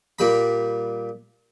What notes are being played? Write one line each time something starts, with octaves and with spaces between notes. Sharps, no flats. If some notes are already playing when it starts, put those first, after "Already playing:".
A#2 G3 B5